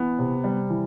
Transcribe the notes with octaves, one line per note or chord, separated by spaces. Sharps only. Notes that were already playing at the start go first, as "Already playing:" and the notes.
Already playing: E3 B3
C3
G3
E3